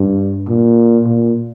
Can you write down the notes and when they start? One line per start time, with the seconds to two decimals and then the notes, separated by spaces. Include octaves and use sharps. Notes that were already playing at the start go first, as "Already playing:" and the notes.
Already playing: G2
0.48 A#2
1.06 A#2